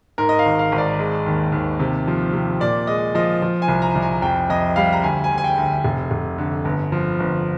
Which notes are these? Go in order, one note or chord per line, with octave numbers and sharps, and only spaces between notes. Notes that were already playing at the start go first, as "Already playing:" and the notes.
G#2 A#4
D#5
F5
G#1
F5
G#1
D5
G#3
D#2
D#2
C3
F3
C3
A#2 D5
G#3 D#5
F3 D#5
F3
G#5
C2
A#5
C2
G#5
F2 G5
F2 D#5
G3 F5
A#5
D2 G#5
G#5
D2
G#5
G5
D2
F1
F1
D3
G1
F3
G1